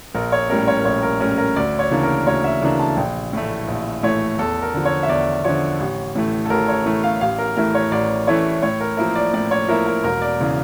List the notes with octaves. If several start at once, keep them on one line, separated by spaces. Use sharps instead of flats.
A#1 A#4
C#5
A2 G3 C#4 A#4
C#5
A#4
A#1 C#5
A#4
A2 G3 C#4 A#4
A#4
D2 D5
C#5
C#3 E3 A#3 D4
A#4
D2 C#5
E5
C#3 E3 A#3 D4
A5
A#1 G5
A2 E3 A3
A#1
A2 E3 A3 C#5
E2 A4
A#4
D3 F3
C#5
E5
E2 D5
D3 F3 C#5
A1
A2 E3 A3
A4
A1 A#4
C#5
A2 E3 A3
F5
A1 F5
A#4
A2 E3 A3 E4 A#4
C#5
A1 D5
A2 E3 A3 E4 C#5
A2 C#5
A#4
F3 A#3 E4 A#4
D5
A2 D5
C#5
F3 A#3 E4 A#4
A#4
E1 A#4
D5
C#3 E3